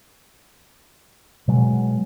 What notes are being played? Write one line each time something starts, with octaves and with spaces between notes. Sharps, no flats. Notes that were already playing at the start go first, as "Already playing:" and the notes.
B2 F#3 G#3